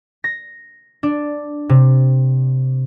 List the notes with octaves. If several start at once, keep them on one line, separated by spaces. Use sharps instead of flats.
A#6
D4
C3